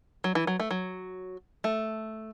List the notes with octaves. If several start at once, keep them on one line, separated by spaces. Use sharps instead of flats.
F#3
E3
F#3
A3
F#3
A3